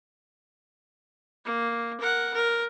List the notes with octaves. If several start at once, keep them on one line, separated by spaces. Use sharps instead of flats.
A#3
A#4 F#5
A#4